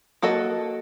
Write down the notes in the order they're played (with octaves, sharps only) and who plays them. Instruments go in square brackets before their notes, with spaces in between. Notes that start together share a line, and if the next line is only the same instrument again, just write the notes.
[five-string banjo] A#3 F#4 A4 D#5